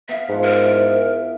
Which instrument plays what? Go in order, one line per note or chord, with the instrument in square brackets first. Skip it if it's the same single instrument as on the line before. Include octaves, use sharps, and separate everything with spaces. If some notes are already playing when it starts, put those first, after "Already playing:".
[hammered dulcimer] B3 F5 [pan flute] E5
[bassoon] G#2 [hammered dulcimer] F3 F#5 B5
[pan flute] A#4
[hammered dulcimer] E4